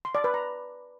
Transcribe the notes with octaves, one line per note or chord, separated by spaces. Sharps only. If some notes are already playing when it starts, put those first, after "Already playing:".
C6
D5
B4
A#5